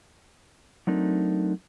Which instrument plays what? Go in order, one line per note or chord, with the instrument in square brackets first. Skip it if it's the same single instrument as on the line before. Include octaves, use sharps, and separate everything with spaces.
[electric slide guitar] F#3 A3 C4 D4 D#4 A#4